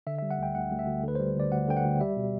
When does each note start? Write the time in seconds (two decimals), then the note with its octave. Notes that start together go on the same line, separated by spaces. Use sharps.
0.07 D3 E5
0.18 E5
0.22 G3
0.31 F#5
0.39 D2 G5
0.55 D2 F#5
0.71 D2
0.79 E5
0.87 D2
1.03 D3 B4
1.15 C5
1.20 G3
1.36 D2 D5
1.52 D2 F#5
1.68 D3 G5
1.77 F#5
1.84 D2
2.01 G3 E5
2.16 B2